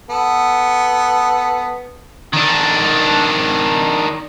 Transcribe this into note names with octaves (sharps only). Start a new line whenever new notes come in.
B3 A4
D#3 D4